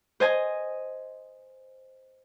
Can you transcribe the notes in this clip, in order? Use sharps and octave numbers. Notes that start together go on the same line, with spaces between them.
C5 D#5 G#5